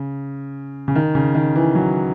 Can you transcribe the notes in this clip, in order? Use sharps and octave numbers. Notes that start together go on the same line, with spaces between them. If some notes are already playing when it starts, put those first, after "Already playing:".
Already playing: C#3
C#3
D#3
C#3
D#3
E3
F#3